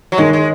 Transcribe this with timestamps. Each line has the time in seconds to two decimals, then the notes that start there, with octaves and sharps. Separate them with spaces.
0.12 F#3
0.18 D#3 G#3
0.33 G#3